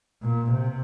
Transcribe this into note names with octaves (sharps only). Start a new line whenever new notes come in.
A#2
C3